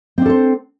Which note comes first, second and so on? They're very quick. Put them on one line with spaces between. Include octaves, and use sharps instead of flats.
C4 D4 A4 C5